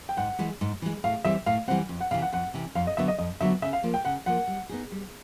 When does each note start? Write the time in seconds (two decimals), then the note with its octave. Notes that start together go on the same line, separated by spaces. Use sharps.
0.09 G5
0.17 G#2 F#5
0.39 E3 G#3
0.61 G#2
0.82 E3 G#3
1.04 A2 F5
1.25 E3 G3 C4 E5
1.46 A2 F5
1.68 E3 G3 C4 F#5
1.89 F2
2.01 F#5
2.11 C3 F5
2.14 E3
2.22 F#5
2.33 F2 F#5
2.54 C3 E3
2.75 F2 F5
2.87 D#5
2.97 D3 F#3 B3 E5
3.08 D#5
3.18 F2 D#5
3.41 D3 F#3 B3 E5
3.62 C#3 E5
3.73 F5
3.83 F3 A#3
3.94 G5
4.05 C#3 F#5
4.26 F3 A#3 F#5
4.47 G3
4.69 B3 D#4 G#4
4.92 G3